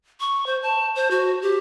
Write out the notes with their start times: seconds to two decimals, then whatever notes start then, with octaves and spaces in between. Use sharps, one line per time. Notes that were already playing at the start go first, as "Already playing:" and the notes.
0.20 C#6
0.46 C5
0.63 A5
0.95 C5
1.11 F#4
1.42 G4